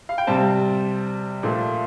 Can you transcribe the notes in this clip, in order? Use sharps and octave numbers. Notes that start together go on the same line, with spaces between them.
F5
G5
C3 G3 C4 A5
A#2 F3 A3